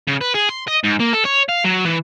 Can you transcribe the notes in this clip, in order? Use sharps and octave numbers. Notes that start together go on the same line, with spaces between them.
C#3
B4
G#4
C6
D#5
G#2
A#3
A4
C#5
F5
F#3
E3